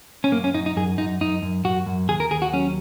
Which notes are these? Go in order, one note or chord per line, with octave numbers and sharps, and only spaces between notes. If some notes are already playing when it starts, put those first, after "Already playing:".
C#4
F#2 A#3
C#4
F#2 D#4
D#4
F#2 G#4
F#2 D#4
F#2 D#4
F#2
F#2 F#4
F#2
D#2 G#4
A#4
D#2 G#4
F#4
F#3 C#4